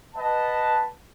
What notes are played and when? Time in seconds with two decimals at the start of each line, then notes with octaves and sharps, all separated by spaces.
0.15 B4 D#5 F#5 A5